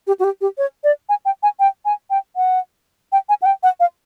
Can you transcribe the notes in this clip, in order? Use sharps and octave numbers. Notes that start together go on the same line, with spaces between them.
G4
F#4
G4
G4
C#5
D5
G#5
G5
G#5
G5
G#5
G5
F#5
G5
G#5
F#5
G5
F#5
F5